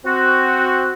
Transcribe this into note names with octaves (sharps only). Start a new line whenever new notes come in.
C4 F#4